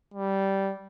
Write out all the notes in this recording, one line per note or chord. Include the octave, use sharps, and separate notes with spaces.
G3